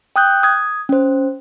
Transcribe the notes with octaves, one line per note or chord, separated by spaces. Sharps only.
G5 D#6 F#6 G6
D#6 G#6
C#4 C5